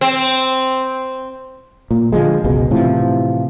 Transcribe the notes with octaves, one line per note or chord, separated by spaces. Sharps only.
C4
A#2
D3 F3 G#3
G1 C#2 B2 G#3
A2 C3 E3 F3